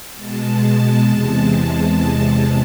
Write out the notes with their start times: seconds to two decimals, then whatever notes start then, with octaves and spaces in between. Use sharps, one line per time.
0.14 B2 G#3 A5
1.04 E2 C3 G#3